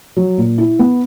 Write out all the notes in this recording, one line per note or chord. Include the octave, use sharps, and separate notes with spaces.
F#3
A#2
E4
B3